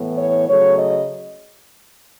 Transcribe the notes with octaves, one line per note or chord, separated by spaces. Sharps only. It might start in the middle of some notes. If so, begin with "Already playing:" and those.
Already playing: A2 E3 B3
C#5
C#3 F#3 A3 C#5
D#5